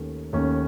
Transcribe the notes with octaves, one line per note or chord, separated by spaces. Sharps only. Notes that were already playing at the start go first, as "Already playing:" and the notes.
Already playing: D#2 D#3 A3 C#4
D#2 D#3 A3 C#4